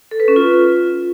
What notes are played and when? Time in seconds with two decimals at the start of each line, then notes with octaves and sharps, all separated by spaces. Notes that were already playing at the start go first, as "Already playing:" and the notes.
0.11 A4
0.20 B4
0.28 C#4
0.36 F4